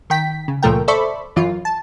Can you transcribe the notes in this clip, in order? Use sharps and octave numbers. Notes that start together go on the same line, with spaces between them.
D#3 G5 B6
C#3
C#2 A#2 F3 A3 A#4 G5
A4 C5 D5 E5 B5 C#6
F#2 E3 F4
A5